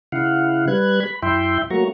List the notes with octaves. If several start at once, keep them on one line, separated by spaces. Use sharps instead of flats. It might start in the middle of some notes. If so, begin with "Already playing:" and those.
C#3 E4 F5 F#5
G3 B4 F#6 G#6
B5
F#2 E4 E5 G5 C6
F#3 A3 A#3 F#4 A#5 C#6